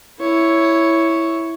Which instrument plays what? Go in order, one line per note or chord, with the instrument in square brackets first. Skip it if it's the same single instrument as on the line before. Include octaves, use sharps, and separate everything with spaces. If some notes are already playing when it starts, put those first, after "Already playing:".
[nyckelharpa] E4 C#5